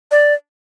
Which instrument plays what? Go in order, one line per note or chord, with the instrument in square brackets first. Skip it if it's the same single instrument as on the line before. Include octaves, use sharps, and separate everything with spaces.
[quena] D5